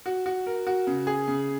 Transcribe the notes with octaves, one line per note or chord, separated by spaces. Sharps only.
F#4
F#4
A#4
F#4
C#3
G#4
C#3